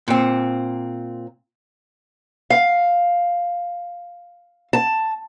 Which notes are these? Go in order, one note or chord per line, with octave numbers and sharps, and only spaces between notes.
A#2 C4
F5
A5